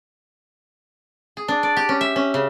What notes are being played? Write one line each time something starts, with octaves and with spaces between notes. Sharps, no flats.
G#4
D4
D5
G4
C#4
E5
C#4
C#3